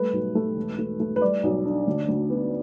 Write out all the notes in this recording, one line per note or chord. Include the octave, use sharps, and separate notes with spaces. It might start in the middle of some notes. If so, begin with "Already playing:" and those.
Already playing: G3 A3 B4
B1
A3
E1
A3
A3
B4
G3 D5
B1
D4
D2
D2
B3